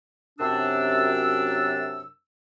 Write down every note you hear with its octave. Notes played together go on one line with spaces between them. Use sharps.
F#2 C3 D4 E6